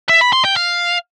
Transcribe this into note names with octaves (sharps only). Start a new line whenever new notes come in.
E5
B5
C6
G5
F5